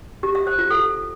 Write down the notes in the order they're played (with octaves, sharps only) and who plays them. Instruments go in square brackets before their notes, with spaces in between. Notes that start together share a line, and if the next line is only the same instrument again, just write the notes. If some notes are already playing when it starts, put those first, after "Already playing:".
[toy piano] G4
E5
C5
F4
A4